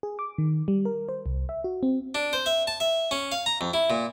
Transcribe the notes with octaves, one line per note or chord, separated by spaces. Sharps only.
G#4
D6
D#3
G3
A#4
C5
C2
E5
F#4
C4
D4
C5
E5
A5
E5
C#4
F5
A#5
F2
E4
A#2